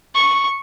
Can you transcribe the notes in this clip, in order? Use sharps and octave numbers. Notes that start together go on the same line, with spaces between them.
C#6